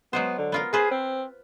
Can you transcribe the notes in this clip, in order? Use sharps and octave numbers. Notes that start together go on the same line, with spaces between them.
F#3 G#3 B3 C5
D3
B3 F4 A#4
F4 G#4 B4 C5
C4